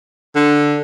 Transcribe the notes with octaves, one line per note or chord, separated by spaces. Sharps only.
D3